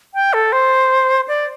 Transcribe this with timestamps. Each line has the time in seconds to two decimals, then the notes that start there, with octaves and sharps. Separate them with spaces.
0.14 G5
0.33 A4
0.52 C5
1.28 D5